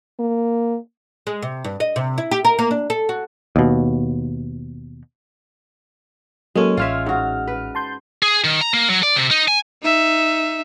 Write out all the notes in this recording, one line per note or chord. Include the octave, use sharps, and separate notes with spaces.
A#3
G#3
C3
G2
D#5
C3
E4
G4
A#4
A#3
D4
A4
F#4
D#2 B2
F#3 G#3 A#3 C#4 A4
A1 F4 C#5 E5 F6
G#2 F#4
B4
A5 C6 G6
G#4
D#3
A#5
A#3
F#3
D5
C3
D#4
G#5
D#4 E5